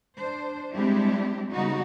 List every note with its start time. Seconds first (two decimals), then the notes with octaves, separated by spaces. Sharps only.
0.17 D4 C5
0.74 G3 G#3 C4 D4 E4 G4
1.51 C#3 G3 B3 D#4 F#4